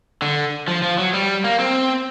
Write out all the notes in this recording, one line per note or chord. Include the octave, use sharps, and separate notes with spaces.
D3
F3
F3
F#3
G3
A#3
C4